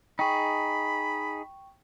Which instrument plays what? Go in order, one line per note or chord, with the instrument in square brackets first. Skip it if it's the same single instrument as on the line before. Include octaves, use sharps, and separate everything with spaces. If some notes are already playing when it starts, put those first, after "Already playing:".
[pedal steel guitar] D#4 G#4 [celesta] G5 C#6 [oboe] B5